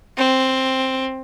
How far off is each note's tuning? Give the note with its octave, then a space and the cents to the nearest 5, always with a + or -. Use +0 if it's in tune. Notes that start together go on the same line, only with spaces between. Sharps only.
C4 +5